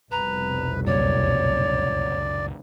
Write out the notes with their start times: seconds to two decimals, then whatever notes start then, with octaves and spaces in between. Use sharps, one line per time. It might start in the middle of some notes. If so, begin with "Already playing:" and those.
0.12 F1 C2 B2 B4 A#5
0.87 C#2 F#2 A#2 C#5 D5